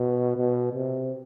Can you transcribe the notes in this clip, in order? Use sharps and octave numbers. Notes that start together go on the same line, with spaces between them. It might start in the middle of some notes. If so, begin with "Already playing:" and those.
Already playing: B2
B2
C3